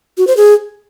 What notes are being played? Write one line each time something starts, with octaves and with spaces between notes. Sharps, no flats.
F#4
C5
G#4